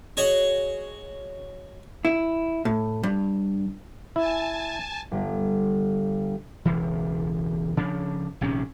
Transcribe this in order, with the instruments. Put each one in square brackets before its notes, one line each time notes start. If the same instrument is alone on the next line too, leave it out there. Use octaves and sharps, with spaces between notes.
[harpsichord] F#4 G#4 C#5 D#5 F#5
[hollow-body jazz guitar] E4
A2
G2
[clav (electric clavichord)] E4 [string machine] G#5 A5
[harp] G1 D3
[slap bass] E1 C#2 E3
C#3 F3 D4
A#1 C3 D#3 C#4